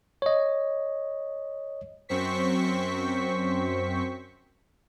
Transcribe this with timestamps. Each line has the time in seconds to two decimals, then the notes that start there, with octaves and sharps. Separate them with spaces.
0.22 C#5 D#5
2.09 F#2 C4 C5 C#6 B6